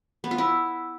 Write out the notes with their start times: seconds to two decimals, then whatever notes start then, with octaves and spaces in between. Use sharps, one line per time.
0.24 B3
0.31 F4
0.38 E4